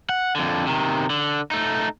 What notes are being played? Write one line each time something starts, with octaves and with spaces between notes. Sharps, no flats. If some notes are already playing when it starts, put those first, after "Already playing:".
F#5
F2 D3
C3 D#3
D3
A3 D#4